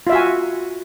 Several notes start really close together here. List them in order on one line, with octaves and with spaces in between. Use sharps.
F4 E5 F#4 G#5